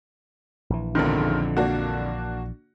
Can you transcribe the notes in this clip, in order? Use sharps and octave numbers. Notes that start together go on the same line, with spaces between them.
A#1 E3
B1 F2 G#2 D3 D#3
A#3 D4 F#4